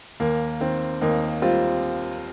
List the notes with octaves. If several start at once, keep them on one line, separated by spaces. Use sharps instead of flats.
D#2 A#3
D#3 C4
D#2 A#3 D#4
G3 C4 F4